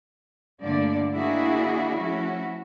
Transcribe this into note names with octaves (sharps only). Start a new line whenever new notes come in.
G2 A#2 D3 A3 D4 D5
D#3 A#3 D4 E4 F#4 G#4
F3 A3 C#4 E4 F#4